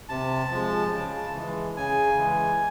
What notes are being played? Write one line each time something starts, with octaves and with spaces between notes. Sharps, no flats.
C3 A5
F3 G#3
C#3
E3 G#3
C#3 G#5
E3 G#3